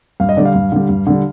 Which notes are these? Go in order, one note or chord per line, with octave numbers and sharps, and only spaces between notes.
G2 F5
D#5
D3 G3 D5
F5
G2
D3 G3
G2
D3 G3